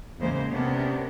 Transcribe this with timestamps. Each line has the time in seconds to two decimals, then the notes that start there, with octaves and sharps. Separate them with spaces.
0.19 E2 A2 C#3 G#3 A#3 C5
0.49 C3 B3 C#4 D4 A#4